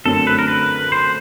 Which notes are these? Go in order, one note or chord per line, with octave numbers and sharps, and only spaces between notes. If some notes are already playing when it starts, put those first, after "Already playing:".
F#2 D3 F#3 A3 C4 A4
B4
A#4
B4
C5